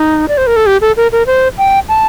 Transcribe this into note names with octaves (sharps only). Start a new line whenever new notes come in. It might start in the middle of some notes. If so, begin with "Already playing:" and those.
Already playing: D#4
D5
C5
A#4
A4
G4
A4
A#4
A#4
C5
G5
A5